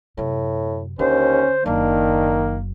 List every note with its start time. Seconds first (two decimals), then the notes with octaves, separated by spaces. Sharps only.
0.17 F#2 A2 C3
0.99 D#2 D3 C#4 C5
1.66 F#1 F#2 D#3 A#3 D4